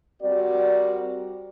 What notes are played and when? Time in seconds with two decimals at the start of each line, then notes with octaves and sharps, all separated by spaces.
0.22 G3 C4 F#4 A#4 D5